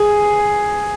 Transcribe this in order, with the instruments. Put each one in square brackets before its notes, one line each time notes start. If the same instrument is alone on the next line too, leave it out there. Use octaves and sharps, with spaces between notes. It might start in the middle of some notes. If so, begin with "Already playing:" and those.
Already playing: [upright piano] G#4